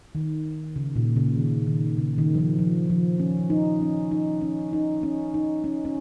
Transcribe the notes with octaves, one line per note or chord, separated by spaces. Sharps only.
D#3
C#3
A#2
C#3
D#3
D#3
C#3
D#3
F3
D#3
F3
F3
C#4
D#4
C#4
D#4
C#4
D#4
C#4
D#4
C#4
C#4